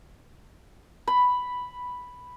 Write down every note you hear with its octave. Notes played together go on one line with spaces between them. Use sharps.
B5